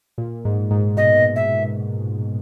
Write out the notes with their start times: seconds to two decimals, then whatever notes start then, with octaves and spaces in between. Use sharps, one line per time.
0.18 A#2
0.45 G#2
0.71 G#2
0.97 B2 D#5
1.36 E5